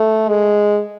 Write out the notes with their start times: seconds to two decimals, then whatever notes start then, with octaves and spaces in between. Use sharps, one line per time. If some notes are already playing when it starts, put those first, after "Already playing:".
Already playing: A3
0.28 G#3